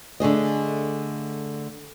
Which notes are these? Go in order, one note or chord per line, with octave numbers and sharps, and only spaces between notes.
D3 A3 G#4 D#5